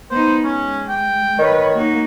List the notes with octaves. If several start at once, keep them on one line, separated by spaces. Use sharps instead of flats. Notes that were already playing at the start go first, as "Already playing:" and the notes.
B3 D#4 C5
G#3 C#4
G5
D#3 B4 C#5
A#3 D#4 F#4